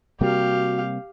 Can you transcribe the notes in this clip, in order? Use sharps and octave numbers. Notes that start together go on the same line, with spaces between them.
C3 G3 A#3 F#4 G4 F5